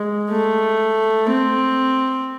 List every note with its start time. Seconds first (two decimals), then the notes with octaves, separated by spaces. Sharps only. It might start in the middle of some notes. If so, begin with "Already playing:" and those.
Already playing: G#3
0.31 A3
1.29 C4